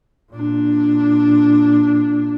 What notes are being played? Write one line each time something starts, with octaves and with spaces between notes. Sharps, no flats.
A#2 D4